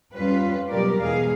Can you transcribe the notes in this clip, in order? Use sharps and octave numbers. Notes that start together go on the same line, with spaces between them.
F2 G3 C#4 F4 B4
B2 F#3 G3 G4 A#4 D5
E2 B2 G#3 G#4 F5